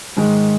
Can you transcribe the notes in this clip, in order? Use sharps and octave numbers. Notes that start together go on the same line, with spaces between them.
G#2 D#3 G#3